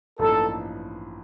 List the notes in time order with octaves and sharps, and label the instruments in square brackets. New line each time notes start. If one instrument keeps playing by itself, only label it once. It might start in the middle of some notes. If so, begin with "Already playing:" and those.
[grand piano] A1 G2 F3 A#3 D#4 [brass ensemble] A4